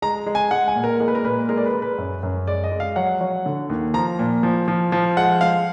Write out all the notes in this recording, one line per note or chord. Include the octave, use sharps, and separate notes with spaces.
G#3 A#5
G#3
G#5
G#3 F#5
G#5
A#2
A#4
G#3 A#4
B4
A#4
A#2 B4
G#3 A#4
D5
B4
G#3
B4
F#2
F#2
G#3 D5
D#5
G#3
F5
F#3 F#5
F#3
D3
D#2
F3 A#5
A#2
F3
F3
F3
G#3 F#5
G#3 F5